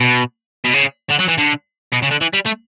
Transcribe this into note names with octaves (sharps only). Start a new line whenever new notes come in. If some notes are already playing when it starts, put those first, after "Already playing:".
B2
B2
C#3
D3
F#3
E3
D3
B2
C#3
D3
E3
G3
A3